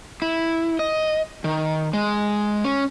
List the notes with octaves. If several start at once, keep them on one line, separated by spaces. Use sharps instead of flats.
E4
D#5
D#3
G#3
C#4